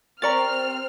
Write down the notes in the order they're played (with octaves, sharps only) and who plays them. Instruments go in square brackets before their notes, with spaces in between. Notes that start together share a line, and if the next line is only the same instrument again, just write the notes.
[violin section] C4 F6 [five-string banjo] G4 A#4 D5 [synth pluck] A#5 C#6 A6